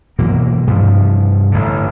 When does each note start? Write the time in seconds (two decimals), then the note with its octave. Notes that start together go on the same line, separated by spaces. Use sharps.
0.19 B2 E3 F#3 A#3
0.67 G2 C3 F3
1.52 A1 A2 D3